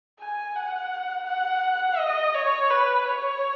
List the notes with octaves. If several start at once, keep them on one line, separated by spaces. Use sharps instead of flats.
G#5
F#5
F#5
D#5
C#5
B4
C#5